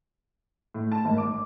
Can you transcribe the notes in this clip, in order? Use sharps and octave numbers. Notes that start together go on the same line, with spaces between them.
A2
A5
G#1
D6
D6